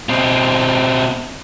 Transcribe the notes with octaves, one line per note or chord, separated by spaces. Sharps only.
B2 C4